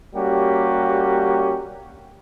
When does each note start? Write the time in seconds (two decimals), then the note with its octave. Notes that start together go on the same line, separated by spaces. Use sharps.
0.15 G3 A#3 C#4 F#4 G4